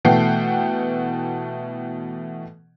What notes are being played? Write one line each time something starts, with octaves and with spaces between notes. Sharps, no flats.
B2 E3 A3 F#5 G5 C7